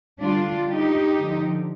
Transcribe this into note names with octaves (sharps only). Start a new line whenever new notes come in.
D3 G3 D4 F4
D#4 G4
D3 F3